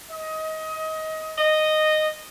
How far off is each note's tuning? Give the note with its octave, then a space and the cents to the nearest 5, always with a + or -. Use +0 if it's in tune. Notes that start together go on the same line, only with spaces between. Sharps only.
D#5 +25
D#5 -10